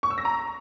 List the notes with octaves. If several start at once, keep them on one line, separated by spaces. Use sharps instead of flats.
C#6
E6
A#6
A#5